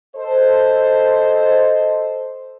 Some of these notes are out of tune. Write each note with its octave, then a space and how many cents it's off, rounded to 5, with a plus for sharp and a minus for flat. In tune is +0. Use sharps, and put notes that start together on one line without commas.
A4 +0 C5 +0 D#5 +0